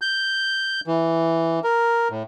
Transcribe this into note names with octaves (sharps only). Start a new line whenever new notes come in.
G6
E3
A#4
A2